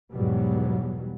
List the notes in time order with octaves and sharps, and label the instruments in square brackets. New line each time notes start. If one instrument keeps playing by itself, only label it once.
[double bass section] E2 G#2 B2 F#3 G3 B3